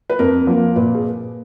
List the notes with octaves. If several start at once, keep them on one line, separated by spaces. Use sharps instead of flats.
B4
F2 A#4
F3 A#3
A#2 B4
G#4